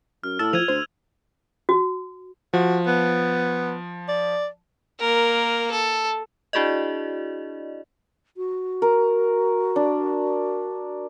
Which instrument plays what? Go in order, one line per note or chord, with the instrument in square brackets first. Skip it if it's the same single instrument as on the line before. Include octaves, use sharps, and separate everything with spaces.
[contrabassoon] F#2 [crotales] F6
[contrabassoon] A2 [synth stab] A5 [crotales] E6
[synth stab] F3 [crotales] G#6 D#7 F7
[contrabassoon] D2 [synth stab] C5
[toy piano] F#4
[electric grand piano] F3 [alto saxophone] F#4
[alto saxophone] B3
D5
[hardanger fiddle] A#3 A#4
A4
[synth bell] D4 E4 F#4 G#4 D5 D#5
[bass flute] F#4
[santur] A#4
D4